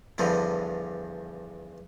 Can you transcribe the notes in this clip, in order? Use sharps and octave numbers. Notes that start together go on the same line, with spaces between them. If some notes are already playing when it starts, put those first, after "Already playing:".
E2 G2 D3 E3 F3